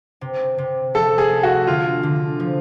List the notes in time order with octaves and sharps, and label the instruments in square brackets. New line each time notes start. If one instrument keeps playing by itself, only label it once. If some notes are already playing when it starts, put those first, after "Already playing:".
[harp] C3
C3
[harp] F3 [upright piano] A4
[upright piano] G#4
[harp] A3
[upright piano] F#4
[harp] D3 [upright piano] F4
[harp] D3
F3